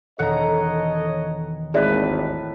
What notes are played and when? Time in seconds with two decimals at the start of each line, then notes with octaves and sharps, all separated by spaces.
0.19 E1 D#3 A4 C#5 D#5 F#5 A#5
1.74 G#1 D#2 A2 G#4 B4 D5 E5